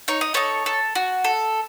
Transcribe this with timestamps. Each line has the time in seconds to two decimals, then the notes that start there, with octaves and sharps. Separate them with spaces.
0.08 D#4 C#5
0.21 D#5
0.34 D#4 A4 C#5
0.66 A4
0.95 F#4
1.24 A4